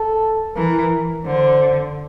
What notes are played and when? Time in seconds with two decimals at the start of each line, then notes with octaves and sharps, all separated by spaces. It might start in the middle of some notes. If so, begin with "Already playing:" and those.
Already playing: A4
0.56 E3 A#4
1.26 D3 C5